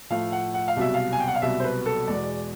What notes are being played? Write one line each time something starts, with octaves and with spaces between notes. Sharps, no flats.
A2 F3 A3 F5
F#5
F#5
F5
C2 B2 F#3 E5
F5
G#5
G5
F#5
F5
C2 B2 F#3 E5
C5
B4
A4
E2 B2 G#3 D5